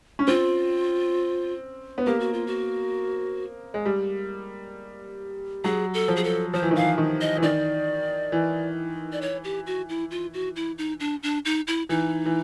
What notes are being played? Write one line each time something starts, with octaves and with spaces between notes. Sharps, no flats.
C#4
C4 F4
B3
A#3 G4
F#4
F4
F#4
G#3
G3
F#3 G#4
A4
F3
G#4
A4
F3 C5
E3
D#3
E3 F5
D#3
D#5
E3
D#3 D5
E3
D5
C#5
G4
F#4
E4
F4
F#4
E4
D#4
D4
D4
D#4
E4
E3 D#4
E3